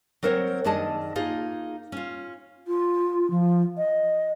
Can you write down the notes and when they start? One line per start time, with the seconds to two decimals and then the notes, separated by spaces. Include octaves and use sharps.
0.23 F#3 C4 A#4 C5 C#5
0.64 F#2 D#3 D4 G#4 D#5 A5
1.15 A#3 D#4 F4 G#4
1.92 C#4 F4
2.67 F4
3.30 F3
3.77 D#5